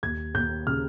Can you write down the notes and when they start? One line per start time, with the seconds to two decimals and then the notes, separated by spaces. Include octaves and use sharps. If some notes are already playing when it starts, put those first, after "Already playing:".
0.03 D#2 G#6
0.34 D#2 G6
0.67 C#3 F6